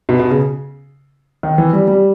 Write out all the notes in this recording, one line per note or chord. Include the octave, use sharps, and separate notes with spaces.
B2
B2
C#3
D#3
E3
G3
G3